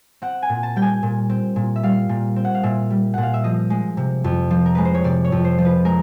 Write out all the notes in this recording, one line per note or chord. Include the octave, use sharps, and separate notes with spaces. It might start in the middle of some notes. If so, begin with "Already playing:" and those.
C4 F#5
G#5
A#2
A5
G3 G5
G#5
A#2
C4
A#2
E5
G3 F5
A#2
C4
F#5
F5
A#2 E5
G3
A#2 F#5
F5
E5
F3 D#5
G#3
C3
F2
F3
A#4
G#3 B4
C5
C#5
C3 D5
C#5
F2
C5
F3
B4
G#3 A#4